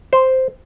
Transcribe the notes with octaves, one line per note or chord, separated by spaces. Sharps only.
C5